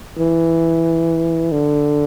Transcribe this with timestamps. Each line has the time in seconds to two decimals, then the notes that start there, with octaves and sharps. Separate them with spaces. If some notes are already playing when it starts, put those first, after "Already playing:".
0.19 E3
1.52 D3